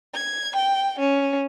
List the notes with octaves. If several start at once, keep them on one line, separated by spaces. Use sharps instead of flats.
G#6
G5
C#4